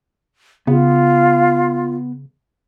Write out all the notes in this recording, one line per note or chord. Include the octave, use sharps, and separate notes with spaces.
C#3 B3 F4